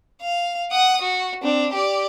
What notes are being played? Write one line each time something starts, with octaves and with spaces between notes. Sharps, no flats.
F5
F#5 D#6
F#4
C4 D4
G4 D5